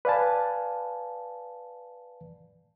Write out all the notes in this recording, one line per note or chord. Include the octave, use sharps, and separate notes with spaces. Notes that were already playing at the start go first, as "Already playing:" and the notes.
B4 D5 F5 G#5 A5